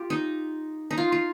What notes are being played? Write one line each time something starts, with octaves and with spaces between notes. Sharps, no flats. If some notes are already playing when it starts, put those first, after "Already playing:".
Already playing: F4 G4
D#4
D#4
F4
F4